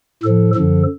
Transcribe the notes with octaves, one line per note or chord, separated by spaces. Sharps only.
A2 F3 A4
F#2 D3 F3 A4